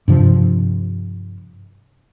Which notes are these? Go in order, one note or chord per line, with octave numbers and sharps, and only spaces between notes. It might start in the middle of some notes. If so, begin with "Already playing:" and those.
G2 C3 F3